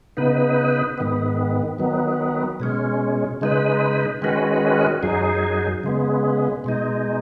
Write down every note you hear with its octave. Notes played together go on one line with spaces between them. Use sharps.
C#3 B3 D#4 B4
G#2 D#3 B3
D#3 F#3 B3
B2 G#3 C#4
C#3 G#3 D#4 B4
D#3 G#3 C#4 F#4 B4
F#2 F#3 D#4 G#4
C#3 G#3 B3
B2 G#3 D#4